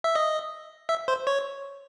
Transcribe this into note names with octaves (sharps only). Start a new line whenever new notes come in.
E5
D#5
E5
C5
C#5